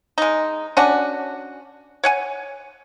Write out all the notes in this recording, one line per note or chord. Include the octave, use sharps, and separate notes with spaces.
G#3 D#4
C#4 D4 F#4
C#5 F#5 G#5